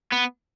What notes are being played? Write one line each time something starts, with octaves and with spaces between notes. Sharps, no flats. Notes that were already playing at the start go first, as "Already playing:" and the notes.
B3